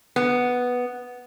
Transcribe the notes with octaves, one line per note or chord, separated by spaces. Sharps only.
B3